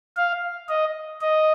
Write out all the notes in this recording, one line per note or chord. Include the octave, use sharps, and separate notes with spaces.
F5
D#5
D#5